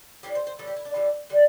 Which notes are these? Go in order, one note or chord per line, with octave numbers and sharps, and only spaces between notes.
A2 E3 G3 G4
C5
C5
A2 E3 G3 A4
G4
E4
D4
A2 E3 G3
D3 G3